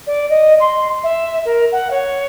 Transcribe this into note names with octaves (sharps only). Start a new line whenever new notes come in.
D5
D#5
C6
E5
A#4
F#5
C#5